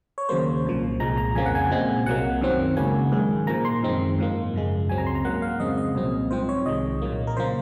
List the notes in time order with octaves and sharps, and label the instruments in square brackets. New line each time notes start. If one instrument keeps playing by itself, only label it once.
[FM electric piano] C#5
D#2 C#3 F#3 A#3 C5
C2 A#2 F3
C2 A#2 G#3 A#5
A#5
F2 C#3 F3 A#3 G#5
F#5
G#5
A#2 G#3 C4
C2 C3 F#3 A#3 F#5
F#2 D#3 F#3 C4
C#2 C#3 F#3 A#3 G#5
G#2 D#3 G#3
A#2 F3 A#3 A#5
C6
F#2 D#3 G#3 C4
G#2 F3 A#3
F#2 C#3 G#3
C#2 C#3 F#3 C4 G#5
A#5
C6
A#5
G#2 F#3 A#3 F#5
F5
F2 C#3 G#3 C4 D#5
D#5
C2 A#2 F#3 C4
G#2 F3 C4 C5
C#5
C2 C3 D#3 G#3 D#5
A#2 F#3 A#3
A#4
C#3 F3 A#3 C5